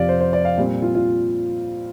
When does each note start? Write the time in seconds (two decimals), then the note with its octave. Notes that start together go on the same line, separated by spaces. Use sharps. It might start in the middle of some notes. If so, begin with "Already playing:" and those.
Already playing: F2 C3 F3 C4 G4 D5 F5
0.09 C5
0.20 C5
0.33 D5
0.45 F5
0.57 A#2 G3 C4
0.82 F4
0.95 F4